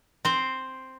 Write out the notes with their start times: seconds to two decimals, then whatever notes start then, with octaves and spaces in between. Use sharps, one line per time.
0.25 C4 C5